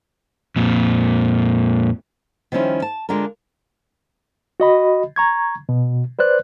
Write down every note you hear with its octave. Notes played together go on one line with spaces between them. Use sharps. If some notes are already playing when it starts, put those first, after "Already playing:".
F2 A#2
D#3 F3 G3 C#4 E4 F4
A5
D3 G#3 D4 F4 A#4
F#4 D#5 B5
A#5 C#6 G#6
B2
B4 C5 D5 F#6